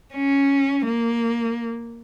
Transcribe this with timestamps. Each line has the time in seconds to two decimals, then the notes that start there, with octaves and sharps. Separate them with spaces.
0.14 C#4
0.86 A#3